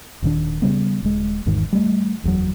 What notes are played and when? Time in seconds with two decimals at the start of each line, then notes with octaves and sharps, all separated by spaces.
0.22 D#1 A#2 D#3 D4
0.62 C#3 G3 B3
1.03 D#1 G#3
1.46 G#1 E2 G#2 D#3
1.73 G3 A3
2.24 F#1 E2 B2 F#3